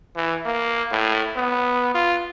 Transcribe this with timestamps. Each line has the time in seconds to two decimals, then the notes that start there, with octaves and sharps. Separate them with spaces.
0.16 E3
0.46 A#3
0.92 A2
1.36 B3
1.95 F4